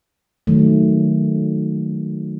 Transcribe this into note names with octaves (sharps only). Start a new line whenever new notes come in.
D#3 F#3 A3